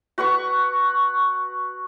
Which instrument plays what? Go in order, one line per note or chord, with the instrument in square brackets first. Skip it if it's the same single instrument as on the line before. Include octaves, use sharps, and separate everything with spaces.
[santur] F#4 B4 F#5 C#6